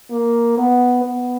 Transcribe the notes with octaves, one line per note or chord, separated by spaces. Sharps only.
A#3
B3
B3